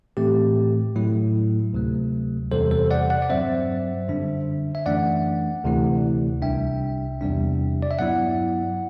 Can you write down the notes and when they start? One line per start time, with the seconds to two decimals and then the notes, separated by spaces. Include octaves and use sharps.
0.17 A2 E3 A3 C4 G4
0.96 A2 F#3 A3 E4
1.73 D2 C3 F#3 A3
2.52 E2 C3 E3 G3 A4 C5
2.71 A4 C5
2.91 D5 F#5
3.10 D5 F#5
3.22 D5
3.30 G2 F#3 C4 C5 E5
4.08 F#2 D3 G3 D4
4.75 E5
4.86 F#2 E3 A3 D4 D5 F#5
5.64 D2 C3 E3 A3 E4
6.42 C2 C3 G3 D4 E5 G5
7.21 E2 C3 G3 D4
7.82 D5
7.91 E5
7.99 G2 F#3 B3 E4 D5 F#5